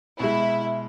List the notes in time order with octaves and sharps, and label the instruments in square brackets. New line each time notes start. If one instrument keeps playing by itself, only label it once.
[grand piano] B2 G#3 [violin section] E4 [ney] E5